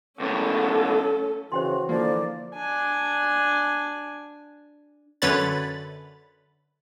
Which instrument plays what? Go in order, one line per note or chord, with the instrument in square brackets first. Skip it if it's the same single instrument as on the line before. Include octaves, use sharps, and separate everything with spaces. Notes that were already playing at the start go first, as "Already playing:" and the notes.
[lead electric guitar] C#2 A2 [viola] C#4 A4
[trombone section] C#3 E3 [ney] F#4 [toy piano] C5 G5 C6
[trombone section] D3 F3 [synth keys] E3 A#3 [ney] D5
[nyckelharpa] D4 G#5
[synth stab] F#2 D3 B4 C#5 B5 A6